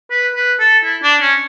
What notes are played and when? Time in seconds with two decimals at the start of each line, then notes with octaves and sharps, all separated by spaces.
0.11 B4
0.35 B4
0.60 A4
0.84 E4
1.02 D4
1.21 C#4